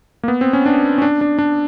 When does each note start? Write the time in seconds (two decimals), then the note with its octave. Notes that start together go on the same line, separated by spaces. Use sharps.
0.23 A#3
0.28 B3
0.41 C4
0.53 C#4
0.66 D4
0.98 C#4
1.02 D4
1.21 D4
1.39 D4